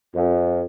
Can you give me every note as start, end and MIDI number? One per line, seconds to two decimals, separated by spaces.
0.15 0.63 41